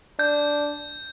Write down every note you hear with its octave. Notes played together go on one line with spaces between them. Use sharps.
D4 G6